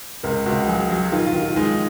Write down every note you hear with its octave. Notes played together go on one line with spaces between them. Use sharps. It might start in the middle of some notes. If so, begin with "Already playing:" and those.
C#2 A#4
C#2 F#4
F#3 G#4
F#3
D#3 F4
F4
D#3
F4
G#3 D#4